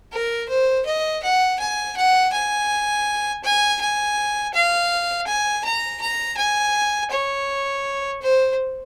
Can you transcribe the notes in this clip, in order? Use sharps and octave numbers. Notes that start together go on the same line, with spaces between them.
A#4
C5
D#5
F#5
G#5
F#5
G#5
G#5
G#5
F5
G#5
A#5
A#5
G#5
C#5
C5